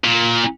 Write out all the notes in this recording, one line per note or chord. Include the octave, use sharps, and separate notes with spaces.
A#2